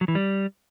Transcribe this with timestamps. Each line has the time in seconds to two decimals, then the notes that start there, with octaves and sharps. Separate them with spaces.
0.01 F#3
0.08 E3
0.15 G3